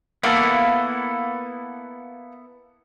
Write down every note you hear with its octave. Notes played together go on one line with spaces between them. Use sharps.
A#3 B3 E4 A4 F5 F#5